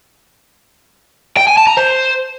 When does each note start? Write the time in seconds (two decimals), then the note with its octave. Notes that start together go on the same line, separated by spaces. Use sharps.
1.37 G5
1.47 G#5
1.57 A5
1.67 A#5
1.77 C5